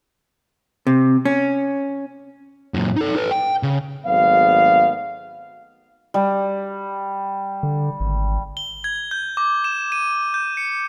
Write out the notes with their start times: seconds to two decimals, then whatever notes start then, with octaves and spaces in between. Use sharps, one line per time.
0.87 C3
1.25 C#4
2.74 F#2 A#2
2.96 D#4 A4
3.16 A4 B4
3.31 G5
3.63 C#3
4.06 G#1 F#3 A3 B3 F5
6.14 G3
7.63 D3
8.00 G#1
8.57 G7
8.84 G#6
8.96 G#6
9.11 G6
9.37 D6
9.64 E7
9.92 D#7
10.34 G6
10.57 C#7